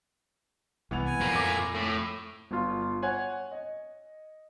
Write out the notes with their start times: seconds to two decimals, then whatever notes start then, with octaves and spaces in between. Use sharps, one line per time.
0.91 C2 E3 B3 F7
1.05 G#5
1.21 F2 A2 F3 A#3
1.36 D6
1.75 A2
2.51 G1 F4
3.02 C#5 F#5 G#5
3.52 D#5